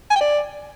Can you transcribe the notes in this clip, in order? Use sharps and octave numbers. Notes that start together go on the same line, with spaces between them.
G#5
G5
D5